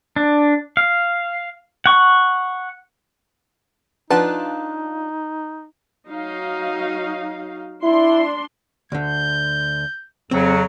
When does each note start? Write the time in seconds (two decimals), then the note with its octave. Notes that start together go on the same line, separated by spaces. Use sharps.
0.16 D4
0.77 F5
1.86 F#5 C#6
4.10 F3 D4 D#4 F4 B4 F#5 A5 F#6
6.09 F#3 D#4 F5
7.83 D4 E4 C6
8.92 D2 D3 G6
10.31 F2 C#3 F#3 C4